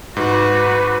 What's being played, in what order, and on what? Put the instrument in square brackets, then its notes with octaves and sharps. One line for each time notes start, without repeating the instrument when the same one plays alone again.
[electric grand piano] G#2 [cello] F#4 [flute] B4